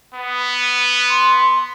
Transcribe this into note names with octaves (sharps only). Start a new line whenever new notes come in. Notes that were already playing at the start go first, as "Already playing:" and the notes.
B3
C6